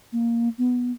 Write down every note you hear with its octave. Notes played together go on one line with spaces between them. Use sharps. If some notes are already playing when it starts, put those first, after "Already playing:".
A#3
B3